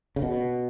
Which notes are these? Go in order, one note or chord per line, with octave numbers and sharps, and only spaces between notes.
C#3
B2